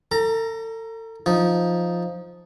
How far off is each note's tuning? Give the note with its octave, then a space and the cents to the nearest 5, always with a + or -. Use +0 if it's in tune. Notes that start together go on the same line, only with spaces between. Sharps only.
A4 +35 A#5 +5
F3 +0 D#4 +0